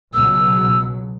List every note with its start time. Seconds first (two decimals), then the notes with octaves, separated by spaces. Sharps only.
0.14 C#2 B2 F#3 E6